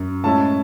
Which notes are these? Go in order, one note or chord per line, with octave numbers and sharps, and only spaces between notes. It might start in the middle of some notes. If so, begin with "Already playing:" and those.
Already playing: F#2
A2 G#3 C#4 E4 A5